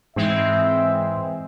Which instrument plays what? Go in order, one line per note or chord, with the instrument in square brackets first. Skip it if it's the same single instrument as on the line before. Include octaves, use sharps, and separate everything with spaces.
[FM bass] G#2 [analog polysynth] E3 G#3 C4 [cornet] E5